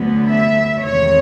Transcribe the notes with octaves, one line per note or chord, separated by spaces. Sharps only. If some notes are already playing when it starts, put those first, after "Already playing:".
Already playing: D2 D3 F#3 B3
E5
E2 C3 D#3 G#3 C4 C#5